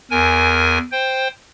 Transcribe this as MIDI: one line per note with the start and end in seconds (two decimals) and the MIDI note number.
0.11 0.78 40
0.11 0.78 70
0.11 0.78 80
0.92 1.28 72
0.92 1.28 79